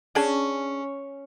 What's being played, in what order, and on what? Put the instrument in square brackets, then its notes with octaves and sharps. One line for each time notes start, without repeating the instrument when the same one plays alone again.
[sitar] C#4 [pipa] D4 G#4 A5